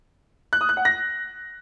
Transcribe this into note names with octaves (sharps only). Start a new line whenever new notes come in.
F#6
D#6
F#6
F#5
A#6